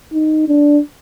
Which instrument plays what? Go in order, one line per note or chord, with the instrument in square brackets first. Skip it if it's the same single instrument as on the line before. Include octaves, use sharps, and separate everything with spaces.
[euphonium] D#4
D4